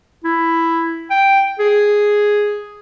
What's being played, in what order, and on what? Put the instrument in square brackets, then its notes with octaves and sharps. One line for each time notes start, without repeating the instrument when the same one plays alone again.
[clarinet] E4
G5
G#4